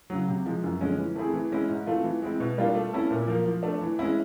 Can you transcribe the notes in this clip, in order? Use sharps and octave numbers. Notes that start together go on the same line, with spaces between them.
C#3 F#3
C3
F3 G#3
F#2
D3 F3 G#3 C#4
E3
A3 C4 E4 G#4
E3
G#3 C#4 E4
G#2
E3 A3 C4 F4
E3
G#3 C4 E4
B2
G3 A#3 D4 F4
A3
C#4 E4 A4
A#2
F3 A#3
F3
A3 D4
E3
G#3 C#4 E4